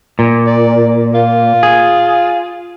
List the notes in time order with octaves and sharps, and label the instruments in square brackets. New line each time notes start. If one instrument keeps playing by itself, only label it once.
[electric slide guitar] A#2
[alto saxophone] D5
F4
[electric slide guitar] G#4